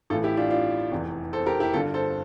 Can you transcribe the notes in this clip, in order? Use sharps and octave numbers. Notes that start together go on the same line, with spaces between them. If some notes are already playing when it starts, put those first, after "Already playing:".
A1 A2 E3 F4 A4
E4 G4
D4 F4
D4 F4
F1 E2 E3
A4 C5
G4 A#4
E4 G4
G1 G2 D3 F4 A4
A4 C5